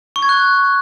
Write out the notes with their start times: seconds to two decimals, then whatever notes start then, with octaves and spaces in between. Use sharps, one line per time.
0.16 C#6
0.22 G#6
0.29 F#6